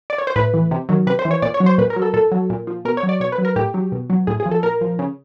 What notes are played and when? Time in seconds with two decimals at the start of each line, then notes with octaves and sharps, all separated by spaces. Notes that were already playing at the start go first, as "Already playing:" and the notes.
0.10 D5
0.18 C#5
0.27 C5
0.36 A2 B4
0.54 E3
0.71 C3
0.89 D#3 F#3
1.07 C3 B4
1.19 C5
1.25 E3
1.31 C#5
1.42 A#2 D5
1.54 C#5
1.60 F#3
1.66 C5
1.78 A#2 B4
1.90 A#4
1.96 F#3
2.02 A4
2.14 A#2 A4
2.32 F#3
2.50 A#2
2.67 F3
2.85 B2 A#4
2.97 C#5
3.03 F#3
3.09 D5
3.20 B2 C#5
3.32 B4
3.38 F#3
3.45 A#4
3.56 A2 G4
3.74 F#3
3.92 B2
4.10 F#3
4.27 A2 G#4
4.40 G#4
4.46 F3
4.51 A4
4.63 A#2 A#4
4.81 F3
4.99 C#3